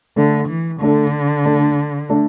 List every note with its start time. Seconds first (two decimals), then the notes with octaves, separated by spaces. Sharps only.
0.16 D3 A3 D4 A4
0.49 E3
0.80 D3 A3 D4 A4
1.45 A3 D4 A4
2.09 A3 D4 A4